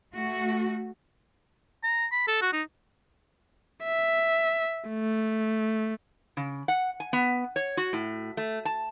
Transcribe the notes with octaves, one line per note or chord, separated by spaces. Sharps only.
A3 F#4
A#5
B5
A4
F#4
D#4
E5
A3
C#3
F#5
G#5
B3
C#5
F#4
A2
A3
A5